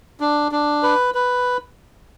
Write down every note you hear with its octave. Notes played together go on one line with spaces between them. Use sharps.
D4
D4
B4
B4